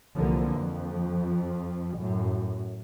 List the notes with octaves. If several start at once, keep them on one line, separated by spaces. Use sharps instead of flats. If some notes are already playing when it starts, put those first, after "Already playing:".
C2 D3 E3 F3 A#3
F2 F3
F#2 A2